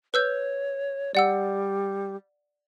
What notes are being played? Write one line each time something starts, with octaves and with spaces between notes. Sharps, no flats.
B4 C#5 E6 G6
G3 D5 F#5 E6